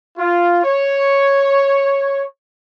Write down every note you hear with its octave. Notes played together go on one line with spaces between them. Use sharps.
F4
C#5